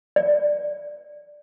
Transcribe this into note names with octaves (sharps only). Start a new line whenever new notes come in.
D5